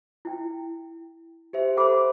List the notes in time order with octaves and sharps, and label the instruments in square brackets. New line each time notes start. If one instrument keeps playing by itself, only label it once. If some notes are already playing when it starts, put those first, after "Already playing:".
[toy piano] E4 G5
[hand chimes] G4 C5 E5
[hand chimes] A4 C5 [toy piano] F#5 B5 D6